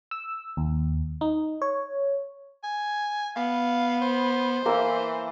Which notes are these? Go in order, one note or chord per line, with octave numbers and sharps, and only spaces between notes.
E6
D#2
D#4
C#5
G#5
B3 F5
C5
E3 A#3 A#4 E6